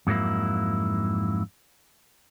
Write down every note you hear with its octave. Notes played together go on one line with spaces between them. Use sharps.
F2 G#2 F#3 A#3 E4